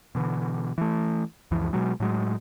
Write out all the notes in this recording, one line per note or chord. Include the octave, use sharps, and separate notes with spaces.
B2 D3 E3
E3 A3
C#2 F#2 E3 F3
B2 F#3 G#3
A2 F#3 G#3